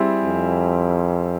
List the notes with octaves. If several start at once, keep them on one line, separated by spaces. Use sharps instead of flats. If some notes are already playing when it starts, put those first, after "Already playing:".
Already playing: G3 C4 E4 G#4
F2